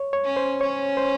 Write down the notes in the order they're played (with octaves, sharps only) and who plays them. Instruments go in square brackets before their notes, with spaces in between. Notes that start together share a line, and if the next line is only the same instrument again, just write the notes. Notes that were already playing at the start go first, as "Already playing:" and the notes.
Already playing: [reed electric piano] C#5
C#5
[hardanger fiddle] C#4
[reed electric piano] C5
[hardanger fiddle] C#4 [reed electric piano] C#5
[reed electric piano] C5